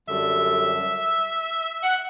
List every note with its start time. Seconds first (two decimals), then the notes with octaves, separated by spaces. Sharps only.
0.07 F#2 D3 G3 E5
1.83 F#5